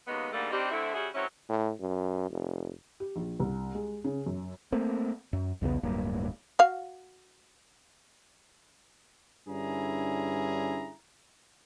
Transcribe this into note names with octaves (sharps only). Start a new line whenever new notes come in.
D#2 C#3 G#3 B3
G#2 D3 G3 A3 A#3
G3 C4 D4 D#4 G4
D3 A3 C4 E4
G3 C#4 F#4 G#4 E5
F#3 A3 C4 C#4 E4
A2
F#2
F1
G4
A#1
C2
G#3
C#3
F#2
A3 A#3 C4
F#2
B1 E2 C#3 B3
D1 G2 F#3 A#3
F#4 F5
G2 D3 C#4 E4 G#4 A#5